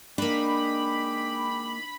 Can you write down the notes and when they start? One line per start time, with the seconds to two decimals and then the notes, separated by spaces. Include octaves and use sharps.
0.18 G#3 A#3 D4 D#4 G5 B5 D6